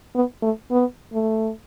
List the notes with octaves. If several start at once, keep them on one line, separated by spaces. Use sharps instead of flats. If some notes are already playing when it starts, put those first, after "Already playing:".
B3
A3
B3
A3